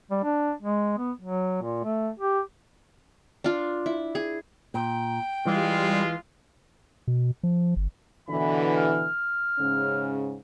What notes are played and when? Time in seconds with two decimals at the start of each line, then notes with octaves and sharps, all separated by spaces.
0.11 G3
0.24 D4
0.62 G#3
0.98 B3
1.21 F#3
1.62 A#2
1.84 A3
2.19 G4
3.44 D4 F4
3.86 E4
4.15 G#4
4.74 A#2 G5
5.46 E3 G3 G#3 F4
7.08 B2
7.43 F3
7.76 G1
8.29 B2 D3 E3 B5
8.77 F6
9.59 G#2 C#3 C#4